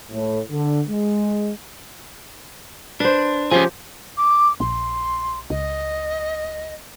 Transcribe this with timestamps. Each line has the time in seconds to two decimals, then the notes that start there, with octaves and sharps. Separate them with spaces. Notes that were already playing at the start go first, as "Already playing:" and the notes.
0.12 A2
0.51 D3
0.89 G#3
3.00 D4 B4 C5
3.51 F3 C#4 F4 G4 G#4
4.17 D6
4.60 A#1 C6
5.50 C#2 D#5